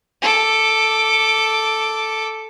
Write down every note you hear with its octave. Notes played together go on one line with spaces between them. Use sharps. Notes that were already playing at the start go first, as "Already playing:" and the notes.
A4 D6